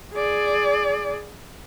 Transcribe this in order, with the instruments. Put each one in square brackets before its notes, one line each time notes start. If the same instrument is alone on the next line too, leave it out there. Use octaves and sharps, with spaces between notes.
[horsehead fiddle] G#4 D5